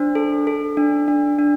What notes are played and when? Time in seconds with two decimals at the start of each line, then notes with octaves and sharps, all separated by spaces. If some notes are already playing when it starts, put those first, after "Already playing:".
Already playing: D4 C5
0.15 A4
0.47 A4
0.77 D4
1.08 D4
1.39 D4